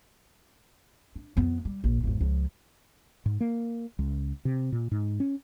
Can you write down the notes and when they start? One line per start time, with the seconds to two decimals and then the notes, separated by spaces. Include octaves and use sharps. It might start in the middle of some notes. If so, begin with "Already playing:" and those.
1.16 D4
1.37 F2 B3
1.65 G3
1.84 A#1
2.03 G#1 E2
2.21 C#2 F3
3.26 G#2
3.41 A#3
3.99 C#2
4.45 C3
4.72 A#2
4.92 G#2
5.20 C#4